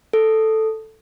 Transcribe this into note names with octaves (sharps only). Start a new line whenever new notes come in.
A4